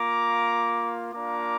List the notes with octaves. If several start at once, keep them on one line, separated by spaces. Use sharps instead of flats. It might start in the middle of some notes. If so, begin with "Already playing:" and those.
Already playing: A#3 F4 A#5 D6
A#3 D4 F4 A#5 D6